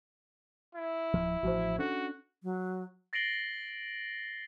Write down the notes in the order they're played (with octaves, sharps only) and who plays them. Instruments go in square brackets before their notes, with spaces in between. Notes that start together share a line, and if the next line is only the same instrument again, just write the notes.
[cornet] E4
[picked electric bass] D1 F3
[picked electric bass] A1 F3 [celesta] F#4 C5
[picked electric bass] C#4 D4 [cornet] F#4 [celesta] A4
[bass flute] F#3
[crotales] A6 A#6 C7 D7 F#7 G7